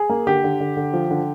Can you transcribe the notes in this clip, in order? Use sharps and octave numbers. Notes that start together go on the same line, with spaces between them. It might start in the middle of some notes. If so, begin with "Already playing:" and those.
Already playing: G#4
A#3
D3 G4
D3
D3
D3
F3
D3